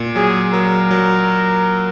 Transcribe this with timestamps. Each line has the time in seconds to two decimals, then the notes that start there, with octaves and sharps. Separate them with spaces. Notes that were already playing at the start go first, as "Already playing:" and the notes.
Already playing: A#2
0.16 F#3 G#4
0.54 F#3 A#4
0.91 F#3